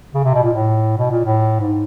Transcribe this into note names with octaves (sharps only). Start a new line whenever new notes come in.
C#3
C3
B2
A#2
A2
B2
A#2
A2
G#2